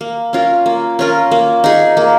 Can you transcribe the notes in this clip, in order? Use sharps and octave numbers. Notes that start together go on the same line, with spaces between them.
A#3
C#4 F4 A#4
A#3
C#4 F4 A#4
A#3
D#4 G#4
A#3